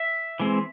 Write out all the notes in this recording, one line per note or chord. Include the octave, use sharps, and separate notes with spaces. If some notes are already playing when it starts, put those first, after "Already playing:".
Already playing: E5
E3 G#3 C4